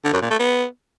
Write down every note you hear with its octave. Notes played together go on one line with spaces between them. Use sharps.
D3
F#2
A#2
A3
B3